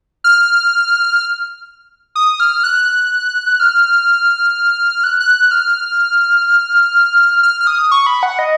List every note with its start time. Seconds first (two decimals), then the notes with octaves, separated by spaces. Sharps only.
0.24 F6
2.15 D#6
2.40 F6
2.64 F#6
3.60 F6
5.04 F#6
5.20 F#6
5.51 F6
7.43 F6
7.61 F6
7.67 D#6
7.92 C#6
8.07 B5
8.23 F#5
8.39 D#5